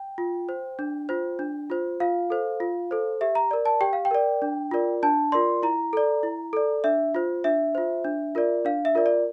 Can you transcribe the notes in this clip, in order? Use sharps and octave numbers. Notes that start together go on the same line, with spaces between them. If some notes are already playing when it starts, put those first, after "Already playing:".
Already playing: G5
F4
C5
D4
F4 C5
D4
F4 C5
F4 F5
A4 C5
F4
A4 C5
G4 E5
A#5
A#4 D5
A5
G4 G5
F5
G5
A#4 D5
D4
F4 A#4 D5
D4 A5
F4 A#4 D5 C6
E4 A#5
A4 D5
E4
A4 D5
D4 E5
F4 C5
D4 E5
F4 C5
D4
F4 A#4 D5
D4 F5
E5
F4 A#4 D5
D5